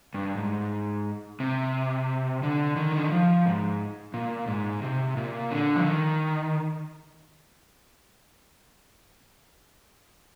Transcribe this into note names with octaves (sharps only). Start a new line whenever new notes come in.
G2
G#2
C3
D3
D#3
D3
D#3
F3
G#2
A#2
G#2
C3
A#2
D3
F3
D#3